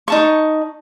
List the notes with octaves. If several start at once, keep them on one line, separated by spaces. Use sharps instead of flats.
D#4 A5 C#6